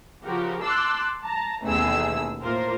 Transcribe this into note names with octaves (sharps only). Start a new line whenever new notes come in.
C#3 F3 F#4 G4 A#4
A5 C6 D6 E6 F#6
A5 A#5
A1 D#2 B2 A3 G#4 E6
A2 A#3 F4 A#4 C5